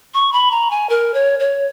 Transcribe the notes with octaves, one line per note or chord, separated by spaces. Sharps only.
C#6
B5
A#5
G#5
A#4
C#5
C#5